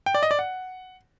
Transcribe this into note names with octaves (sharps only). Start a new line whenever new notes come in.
G5
D5
D#5
D5
F#5